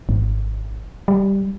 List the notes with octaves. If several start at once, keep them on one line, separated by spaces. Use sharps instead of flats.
G#1
G3